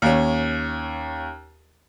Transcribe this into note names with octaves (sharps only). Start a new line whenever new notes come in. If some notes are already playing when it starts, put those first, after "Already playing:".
D#2 C#4